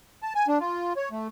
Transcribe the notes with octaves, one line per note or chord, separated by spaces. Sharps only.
A5
G#5
D4
F4
C#5
A3